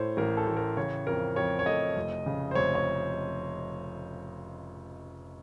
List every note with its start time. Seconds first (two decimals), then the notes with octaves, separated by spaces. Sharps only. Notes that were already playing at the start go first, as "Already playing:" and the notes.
Already playing: A2 A3 C5 C#5
0.17 A1 A#4
0.37 A4
0.47 A1
0.57 A#4
0.77 C#3 C#5
1.07 F2 A#4
1.36 F2 C#5
1.59 C#5
1.66 A3 D#5
1.96 F1
2.26 C#3
2.51 C5
2.55 F1 C#5
2.75 C#5